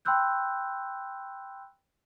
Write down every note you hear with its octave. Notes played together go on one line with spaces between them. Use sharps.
G5 B5 C6 E6 F#6 G6